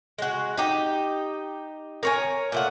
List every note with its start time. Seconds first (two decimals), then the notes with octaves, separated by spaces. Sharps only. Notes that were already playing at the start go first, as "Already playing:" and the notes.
0.18 G#3 F#4
0.57 D#4 G4
2.03 A#4 C#5 G#5
2.52 A#2 A3 F#5